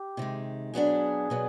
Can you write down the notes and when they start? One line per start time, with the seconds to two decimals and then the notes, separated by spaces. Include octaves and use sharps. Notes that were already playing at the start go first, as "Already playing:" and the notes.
Already playing: G4
0.17 C3 D#3 G#3
0.74 B2 F#3 B3 D4 G#4
1.30 B2 F#3 B3 D4